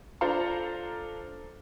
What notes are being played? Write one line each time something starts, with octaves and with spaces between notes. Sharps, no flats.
D4 F4 A4 C5 F5 A#5